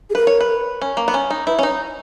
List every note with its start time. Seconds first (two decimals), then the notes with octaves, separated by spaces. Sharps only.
0.10 G#4
0.15 A#4 B4
0.27 C#5
0.41 B4
0.82 C#4
0.97 A#3
1.08 B3
1.14 C#4
1.30 D#4
1.47 E4 B4
1.59 C#4
1.63 D#4 C#5